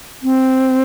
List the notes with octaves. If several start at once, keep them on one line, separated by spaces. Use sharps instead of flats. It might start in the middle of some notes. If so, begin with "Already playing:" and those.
C4